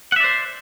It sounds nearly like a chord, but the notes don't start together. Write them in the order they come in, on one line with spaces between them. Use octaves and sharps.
F#5 E5 D5 C5